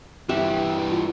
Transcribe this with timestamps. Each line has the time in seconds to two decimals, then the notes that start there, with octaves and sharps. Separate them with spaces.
0.29 G2 E3 G4 E5 F#5
0.92 F4